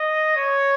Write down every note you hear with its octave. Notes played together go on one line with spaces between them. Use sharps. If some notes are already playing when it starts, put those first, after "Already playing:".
Already playing: D#5
C#5